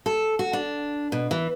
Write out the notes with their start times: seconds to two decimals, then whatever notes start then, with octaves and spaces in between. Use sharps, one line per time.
0.06 A4
0.39 F#4
0.53 D4
1.12 B2
1.31 E3